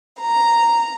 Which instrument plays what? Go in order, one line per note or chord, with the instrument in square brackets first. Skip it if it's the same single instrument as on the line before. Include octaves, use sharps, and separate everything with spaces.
[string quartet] A#5